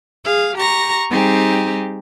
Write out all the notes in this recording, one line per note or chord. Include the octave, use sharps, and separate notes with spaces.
G#4 F5
G4 A#5 C#6 A#6
G3 C4 D#4 G4 G#4